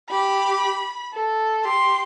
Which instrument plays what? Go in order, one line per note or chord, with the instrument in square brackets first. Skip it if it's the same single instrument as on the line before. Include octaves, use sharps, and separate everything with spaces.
[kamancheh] G4 [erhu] B5
[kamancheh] A4
[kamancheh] G4 [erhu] C6